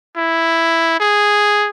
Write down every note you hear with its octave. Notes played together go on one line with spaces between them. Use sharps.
E4
G#4